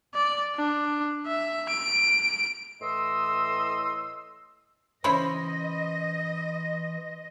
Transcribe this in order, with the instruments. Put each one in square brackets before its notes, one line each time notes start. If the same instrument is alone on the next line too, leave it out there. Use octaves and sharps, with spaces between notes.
[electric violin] D5
D4
E5
D7
[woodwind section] A2 E3 D#5 C6 D#6 E6
[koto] C#3 E4 C#5 [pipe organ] E3 [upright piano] C5 B5 [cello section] D#5